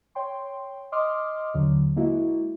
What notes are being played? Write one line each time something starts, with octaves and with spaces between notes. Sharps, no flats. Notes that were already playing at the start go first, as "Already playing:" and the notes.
C#5 G5 C6
D#5 C6 D6 D#6 F6
D#2 D3 F#3
G#3 A#3 E4 F#4